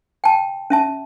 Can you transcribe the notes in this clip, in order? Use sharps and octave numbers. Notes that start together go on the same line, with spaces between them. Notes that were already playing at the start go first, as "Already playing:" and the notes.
G5 A5
C#4 E5 A5